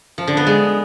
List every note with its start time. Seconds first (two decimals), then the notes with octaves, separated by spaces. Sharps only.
0.18 F3
0.27 D3
0.37 B3
0.47 G#3